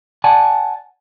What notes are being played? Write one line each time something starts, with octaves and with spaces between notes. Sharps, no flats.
D5 F#5 G#5 A5